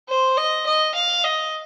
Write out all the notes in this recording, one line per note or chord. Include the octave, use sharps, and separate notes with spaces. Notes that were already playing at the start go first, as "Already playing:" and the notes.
C5
D#5
D#5
F5
D#5